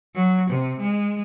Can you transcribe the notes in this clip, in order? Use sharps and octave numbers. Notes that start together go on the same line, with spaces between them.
F#3
C3
G#3